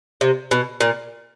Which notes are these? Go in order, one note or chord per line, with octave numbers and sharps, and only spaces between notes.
C3
B2
A#2